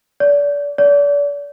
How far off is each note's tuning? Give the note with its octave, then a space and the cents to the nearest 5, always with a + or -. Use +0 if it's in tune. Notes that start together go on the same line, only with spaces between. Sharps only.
D5 -30
D5 -35